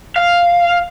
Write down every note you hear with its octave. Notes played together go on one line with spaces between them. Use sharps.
F5